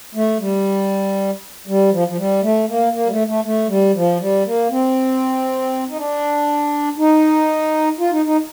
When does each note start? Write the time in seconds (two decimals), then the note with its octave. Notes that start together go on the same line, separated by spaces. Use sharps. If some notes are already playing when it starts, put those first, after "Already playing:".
0.15 A3
0.40 G3
1.67 G3
1.92 F3
2.08 F3
2.18 G3
2.43 A3
2.68 A#3
2.93 A#3
3.06 G3
3.10 A3
3.27 A3
3.45 A3
3.69 G3
3.95 F3
4.21 G3
4.45 A#3
4.70 C4
5.89 D#4
5.98 D4
6.98 D#4
7.99 F4
8.12 D#4
8.26 D#4